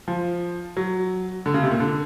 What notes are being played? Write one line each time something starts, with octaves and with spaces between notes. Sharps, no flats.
F3
F#3
D3
C#3
C3
A#2
D3